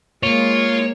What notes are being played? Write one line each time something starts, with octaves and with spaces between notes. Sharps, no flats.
G#3 A#3 F4 C#5